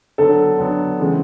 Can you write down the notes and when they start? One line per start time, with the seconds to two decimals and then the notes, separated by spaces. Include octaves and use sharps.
0.18 D3 F#3 B3 A4
0.58 D3 F#3 B3
0.99 C#3 E3 G#3 C4